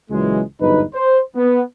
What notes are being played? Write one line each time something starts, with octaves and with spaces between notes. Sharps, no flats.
C#2 A#2 E3 F#3 G#3
G1 E2 G#2 F#3 D#4 B4
C5
B3